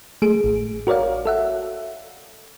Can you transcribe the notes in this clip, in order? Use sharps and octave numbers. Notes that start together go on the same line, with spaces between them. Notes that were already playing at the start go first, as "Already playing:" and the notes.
A3 G#4 D7
A1
F#4 A#4 C#5 D5 F5
A4 E5 F#5